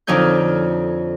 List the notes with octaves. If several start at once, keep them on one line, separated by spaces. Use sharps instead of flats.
F2 D3 F3 D#4 C#5 G6